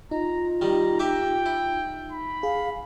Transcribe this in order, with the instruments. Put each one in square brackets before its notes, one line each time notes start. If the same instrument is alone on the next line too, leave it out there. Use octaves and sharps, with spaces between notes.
[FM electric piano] D#4 [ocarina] F4 [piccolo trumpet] A#5
[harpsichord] D#3 G3 [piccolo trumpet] A#5
[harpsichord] G4 E5 D6 [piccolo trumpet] G5
[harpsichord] E4
[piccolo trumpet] B5
[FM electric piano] G#4 [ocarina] F5